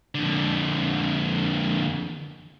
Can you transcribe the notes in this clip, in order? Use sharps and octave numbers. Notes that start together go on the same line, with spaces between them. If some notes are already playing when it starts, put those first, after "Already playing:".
F2 D3